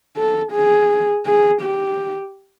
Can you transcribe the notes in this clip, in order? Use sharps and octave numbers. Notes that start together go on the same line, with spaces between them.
A4
G#4
G#4
G4